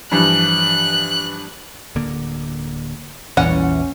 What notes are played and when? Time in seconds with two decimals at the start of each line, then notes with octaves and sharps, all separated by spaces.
0.11 G2 E3 F3 F#6
1.95 D1 D3 A#3
3.37 A#1 E2 A#2 E3 C#4 F#5